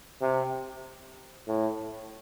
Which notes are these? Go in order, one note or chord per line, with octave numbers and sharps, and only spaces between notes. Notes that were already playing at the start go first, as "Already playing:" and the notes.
C3
A2